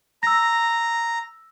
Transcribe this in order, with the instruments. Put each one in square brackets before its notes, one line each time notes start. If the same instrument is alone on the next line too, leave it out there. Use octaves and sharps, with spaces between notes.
[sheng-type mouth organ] A#5 [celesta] E6 A#6